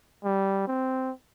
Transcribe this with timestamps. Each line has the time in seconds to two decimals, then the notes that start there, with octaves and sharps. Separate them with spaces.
0.24 G3
0.67 C4